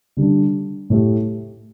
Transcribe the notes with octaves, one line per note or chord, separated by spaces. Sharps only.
D3 G3 D4
A2 A3 G4